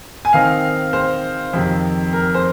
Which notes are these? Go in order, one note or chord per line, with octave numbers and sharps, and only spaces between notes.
G#5
D#3 C4 D#4 F5
C5
F2 C3 D#3
A#4
C5